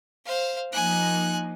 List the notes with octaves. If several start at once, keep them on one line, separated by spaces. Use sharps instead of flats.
C5 F5
F3 A#3 D#4 G#5 F#6